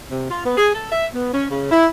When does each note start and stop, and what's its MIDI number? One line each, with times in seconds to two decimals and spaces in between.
0.11 0.27 48
0.31 0.41 65
0.46 0.53 59
0.57 0.70 68
0.74 0.90 69
0.92 1.06 76
1.14 1.31 59
1.33 1.46 61
1.49 1.69 49
1.71 1.86 64